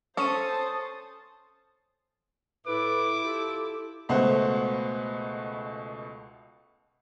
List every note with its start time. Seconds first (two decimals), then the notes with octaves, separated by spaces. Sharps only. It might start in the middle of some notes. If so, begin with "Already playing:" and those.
0.17 C#4 A4 C5 A5 C#6 D#6 D#7
2.67 A2 E4 A4 B4 D6
3.23 F4 G4 A4
4.09 C#2 B2 A3 C5 F#5